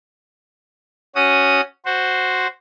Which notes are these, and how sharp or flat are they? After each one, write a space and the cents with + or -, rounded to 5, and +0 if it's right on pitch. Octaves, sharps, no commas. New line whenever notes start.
C#4 +0 F#4 +0 D#6 +0
F#4 +0 C5 +0